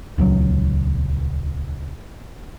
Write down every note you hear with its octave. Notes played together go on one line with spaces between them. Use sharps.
D#1 C#2 F#3